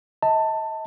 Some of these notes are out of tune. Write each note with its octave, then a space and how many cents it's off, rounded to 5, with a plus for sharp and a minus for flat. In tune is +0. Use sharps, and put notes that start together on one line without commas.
D#5 +40 A5 +15